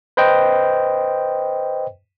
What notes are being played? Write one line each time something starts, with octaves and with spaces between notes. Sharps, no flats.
B4 C5 D#5 G5